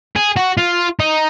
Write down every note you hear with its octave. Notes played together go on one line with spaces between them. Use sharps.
G#4
F#4
F4
D#4